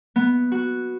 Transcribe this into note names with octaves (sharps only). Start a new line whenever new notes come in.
B3
F#4